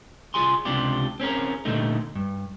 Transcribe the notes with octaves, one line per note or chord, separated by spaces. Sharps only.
F4 G#4 G#5 C6
C#2 C3 D4 F4 G4
C4 C#4 G#4 A#4
A#2 D3 G3 A3 D#4
G2